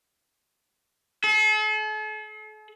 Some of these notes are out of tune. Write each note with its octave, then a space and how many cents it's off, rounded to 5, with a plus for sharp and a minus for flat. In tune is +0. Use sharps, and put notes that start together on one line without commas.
A4 -45